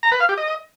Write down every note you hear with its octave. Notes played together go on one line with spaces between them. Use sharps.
A#5
B4
F5
G4
D#5